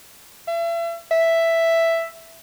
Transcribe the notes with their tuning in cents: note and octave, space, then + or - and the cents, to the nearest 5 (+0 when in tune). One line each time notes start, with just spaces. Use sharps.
E5 +40
E5 +5